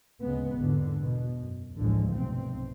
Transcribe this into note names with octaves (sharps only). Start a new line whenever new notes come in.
D2 C#3 G#3 B3
G#1 E2 D3
B2
F#2
A1 D2 A2 D3 F3 G#3
B1 G2 C3 C4